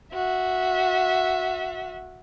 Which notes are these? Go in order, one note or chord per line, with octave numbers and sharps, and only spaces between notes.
F#4 E5